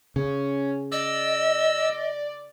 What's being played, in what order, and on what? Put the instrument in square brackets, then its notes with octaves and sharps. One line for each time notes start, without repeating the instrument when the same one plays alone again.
[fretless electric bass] C#3 [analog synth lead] C#4
[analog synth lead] D5 [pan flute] D#5 [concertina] E6